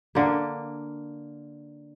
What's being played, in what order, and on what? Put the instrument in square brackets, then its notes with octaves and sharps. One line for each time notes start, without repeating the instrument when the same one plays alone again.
[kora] D3 A#3